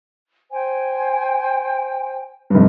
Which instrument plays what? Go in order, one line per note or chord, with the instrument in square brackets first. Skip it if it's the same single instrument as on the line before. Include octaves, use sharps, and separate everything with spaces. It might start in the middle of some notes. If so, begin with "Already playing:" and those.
[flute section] C5 G5 G#5
[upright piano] F1 G2